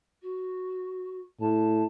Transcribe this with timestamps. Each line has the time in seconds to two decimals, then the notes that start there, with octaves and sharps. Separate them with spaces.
0.22 F#4
1.40 A2 A5